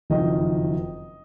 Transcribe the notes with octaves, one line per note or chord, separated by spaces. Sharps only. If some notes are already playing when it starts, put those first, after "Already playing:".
F#1 F2 D#3 D#5